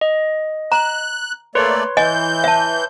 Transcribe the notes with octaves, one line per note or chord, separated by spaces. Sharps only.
D#5
A#5 F#6
A3 A#3 B4 C#5 D5 C6
E3 D#5 G#5 G6
E5 A5